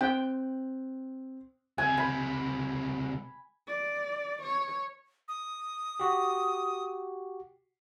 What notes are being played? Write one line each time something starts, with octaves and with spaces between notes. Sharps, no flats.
C4 G5 F#6
C#2 C3 G#5
B5
D5
C#5
D#6
F#4 G4